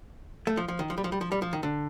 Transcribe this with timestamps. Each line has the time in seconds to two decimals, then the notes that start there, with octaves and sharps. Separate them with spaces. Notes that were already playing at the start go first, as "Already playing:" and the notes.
0.47 A3
0.57 F3
0.68 F3
0.79 D#3
0.90 F3
0.98 G3
1.04 F3
1.12 G3
1.21 F3
1.32 G3
1.42 F3
1.53 D#3
1.63 D3